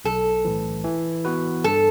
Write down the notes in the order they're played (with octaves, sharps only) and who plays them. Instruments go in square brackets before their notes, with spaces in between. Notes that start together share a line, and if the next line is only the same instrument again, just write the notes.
[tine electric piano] B1 [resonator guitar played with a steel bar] A4
[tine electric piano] A2 E3
E3
B3 F#4 B4
[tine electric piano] G2 [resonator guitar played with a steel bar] A4